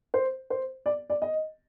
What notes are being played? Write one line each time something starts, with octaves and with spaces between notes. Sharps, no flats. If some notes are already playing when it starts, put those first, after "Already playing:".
C5
C5
D5
D5
D#5